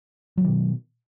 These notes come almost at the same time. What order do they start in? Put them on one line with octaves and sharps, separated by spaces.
F#3 D3 D#3 B2